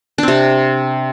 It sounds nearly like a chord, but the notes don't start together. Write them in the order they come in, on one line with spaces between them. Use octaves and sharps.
D4 C4 C3